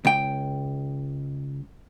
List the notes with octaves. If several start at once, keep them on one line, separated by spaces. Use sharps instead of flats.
C#2 G5